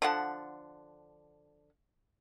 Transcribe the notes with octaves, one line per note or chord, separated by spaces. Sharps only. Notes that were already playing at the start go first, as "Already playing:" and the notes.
D3 F3 F#5